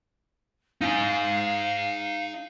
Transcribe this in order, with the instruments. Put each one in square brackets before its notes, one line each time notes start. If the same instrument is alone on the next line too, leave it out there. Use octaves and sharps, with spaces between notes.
[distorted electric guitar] D#4 G#5 [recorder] F5